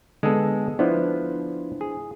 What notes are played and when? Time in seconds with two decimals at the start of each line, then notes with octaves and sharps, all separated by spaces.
0.23 D3 G#3 B3 G#4 A4
0.79 F3 B3 D4 E4 C5
1.81 G#4